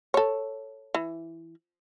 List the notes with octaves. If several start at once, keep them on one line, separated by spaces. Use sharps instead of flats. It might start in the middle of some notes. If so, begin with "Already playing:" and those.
A4 C#5
E3